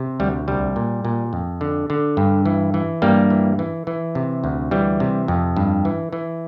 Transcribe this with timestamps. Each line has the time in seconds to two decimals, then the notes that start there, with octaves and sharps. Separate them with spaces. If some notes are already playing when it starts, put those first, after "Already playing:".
Already playing: C3
0.20 D2 G3
0.48 C2 G3
0.76 A#2
1.05 A#2
1.33 F2
1.61 D3
1.90 D3
2.17 G2
2.46 E3
2.74 E3
3.02 G2 G3 A#3
3.30 E3
3.59 E3
3.87 E3
4.15 C3
4.44 D2
4.71 E3 G3
5.00 C3
5.28 F2
5.57 G2
5.85 E3
6.13 E3